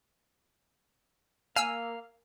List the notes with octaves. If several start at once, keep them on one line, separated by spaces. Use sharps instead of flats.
A#3 F5 G#5 E6